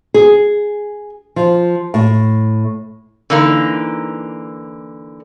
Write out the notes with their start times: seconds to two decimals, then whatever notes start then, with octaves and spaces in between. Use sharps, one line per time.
0.14 G#4
1.36 F3
1.94 A2
3.30 D3 E3 A#3 D#4